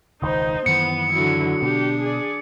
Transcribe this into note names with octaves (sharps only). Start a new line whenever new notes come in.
E1 C#2 D#3 D#4 C5 D#6
F#2 D#3 E3 B3 C#7
D3 F#3 E4
B2 D4 G4
G#4 D5